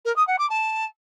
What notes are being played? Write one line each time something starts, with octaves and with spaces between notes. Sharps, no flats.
A#4
D#6
F#5
D6
A5